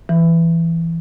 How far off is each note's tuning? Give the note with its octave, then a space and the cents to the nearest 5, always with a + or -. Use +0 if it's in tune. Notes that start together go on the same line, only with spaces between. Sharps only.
E3 +15